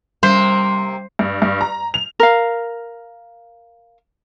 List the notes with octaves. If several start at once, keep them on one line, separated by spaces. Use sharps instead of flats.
C3 G3 A#3 C5
G2
G2
A#5
F7
A#4 F5